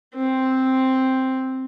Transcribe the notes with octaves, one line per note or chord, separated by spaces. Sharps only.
C4